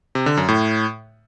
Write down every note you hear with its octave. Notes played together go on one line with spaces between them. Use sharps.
C3
D3
F#2
A2